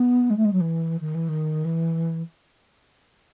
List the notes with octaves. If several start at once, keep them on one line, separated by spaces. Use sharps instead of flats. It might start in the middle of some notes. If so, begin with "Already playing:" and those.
Already playing: B3
G#3
A3
G#3
F#3
E3
D#3
E3
D#3
E3